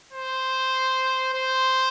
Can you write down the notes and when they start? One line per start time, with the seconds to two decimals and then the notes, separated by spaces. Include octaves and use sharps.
0.13 C5
1.34 C5